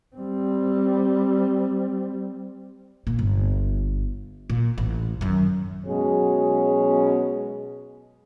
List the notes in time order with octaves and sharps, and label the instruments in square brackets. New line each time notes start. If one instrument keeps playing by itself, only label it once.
[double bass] G3 C4
[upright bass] A#2
G1
A#2
A1
F#2 D#3
[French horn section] B2 F#3 G#3 C#4 G#4